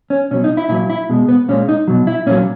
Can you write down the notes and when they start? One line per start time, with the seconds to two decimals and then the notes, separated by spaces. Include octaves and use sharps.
0.10 C#4
0.31 B2 C#4
0.34 F#3
0.44 D#4
0.57 E4
0.69 A#2 F#3 E4
0.90 E4
1.09 B2 G#3
1.29 B3
1.49 A#2 G#3 C#4
1.69 D#4
1.88 B2 F#3
2.07 E4
2.26 A#2 C#4
2.31 F#3